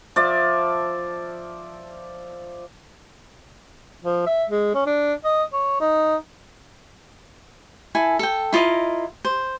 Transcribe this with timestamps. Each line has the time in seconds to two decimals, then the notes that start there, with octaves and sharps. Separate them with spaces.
0.16 F3 D5 E5
4.04 F3
4.26 E5
4.49 G#3
4.74 C#4
4.86 D4
5.24 D#5
5.53 C#5
5.80 D#4
7.95 E4 A4 G#5
8.19 A4 G5
8.53 E4 F4 A#4 D#5
9.25 C5